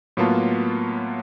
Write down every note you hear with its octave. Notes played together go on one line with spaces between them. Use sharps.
A2 F#3 A#3 B3 F4 A5